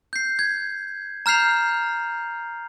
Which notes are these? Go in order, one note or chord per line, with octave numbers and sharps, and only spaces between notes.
G6 C7
G#6
A#5 F6 G6 C7 F7